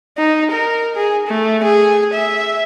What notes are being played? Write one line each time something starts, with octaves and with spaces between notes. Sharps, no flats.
D#4
A#4
G#4
A3
G#4
E5